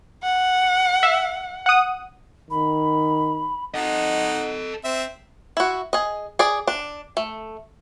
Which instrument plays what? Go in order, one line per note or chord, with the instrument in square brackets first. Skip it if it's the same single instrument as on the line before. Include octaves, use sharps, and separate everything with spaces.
[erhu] F#5
[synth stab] E5
F#5 D#6
[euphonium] D#3 [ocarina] B5
[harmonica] D#4 F#5 [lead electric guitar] A4 D#5
[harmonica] C4 E5
[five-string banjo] E4 F#4
G#4 D#5
G#4 D5
D4
A3